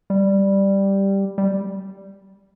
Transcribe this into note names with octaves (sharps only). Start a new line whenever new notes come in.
G3
G3